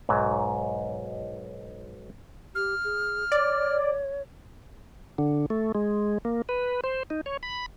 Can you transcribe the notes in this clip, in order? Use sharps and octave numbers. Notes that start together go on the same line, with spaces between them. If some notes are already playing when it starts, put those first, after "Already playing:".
B1 G#2 F#3
G4 F6
G#4
C#5 D5
D3
A3
G#3
A#3
B4
C5
D#4
C#5
B5